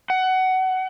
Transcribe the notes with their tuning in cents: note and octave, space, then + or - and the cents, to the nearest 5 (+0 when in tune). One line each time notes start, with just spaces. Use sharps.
F#5 +20